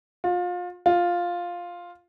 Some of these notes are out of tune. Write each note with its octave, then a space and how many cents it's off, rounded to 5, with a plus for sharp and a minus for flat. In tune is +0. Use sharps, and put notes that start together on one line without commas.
F4 +30
F4 +5